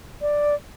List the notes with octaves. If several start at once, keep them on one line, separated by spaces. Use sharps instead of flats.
D5